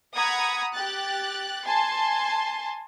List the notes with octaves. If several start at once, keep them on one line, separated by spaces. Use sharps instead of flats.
F#5 A#5 B5 D#6 G#6
G4 F#6 A6
G#5 A5 C6